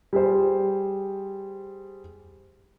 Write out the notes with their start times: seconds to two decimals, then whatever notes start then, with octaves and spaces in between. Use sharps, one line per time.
0.13 G3 G#4 C5